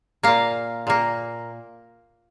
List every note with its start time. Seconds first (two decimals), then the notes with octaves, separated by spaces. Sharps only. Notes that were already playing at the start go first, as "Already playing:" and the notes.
0.23 A#2 A#3 F5
0.87 A#2 A#3